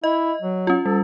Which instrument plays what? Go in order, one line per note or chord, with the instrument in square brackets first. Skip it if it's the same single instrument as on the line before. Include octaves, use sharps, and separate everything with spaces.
[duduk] E4 [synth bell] D#5
[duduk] F#3
[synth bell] C#4 F4
[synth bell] G3 [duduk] A4